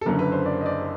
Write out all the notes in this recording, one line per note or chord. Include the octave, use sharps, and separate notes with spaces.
A4
F#1 F#2 D3 A#4
B4
C5
D5
D#5
D5